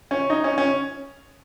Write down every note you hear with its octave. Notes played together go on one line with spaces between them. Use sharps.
C#4
D#4
C#4
C#4